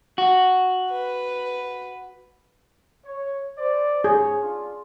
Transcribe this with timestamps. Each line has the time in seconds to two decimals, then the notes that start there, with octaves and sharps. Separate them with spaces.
0.18 F#4
0.91 B4
3.05 C#5
3.58 C5 D5
4.04 G#2 G#4 C#5
4.42 D4 F4